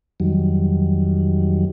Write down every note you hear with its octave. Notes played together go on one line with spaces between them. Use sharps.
F2 D#3 F#3 G3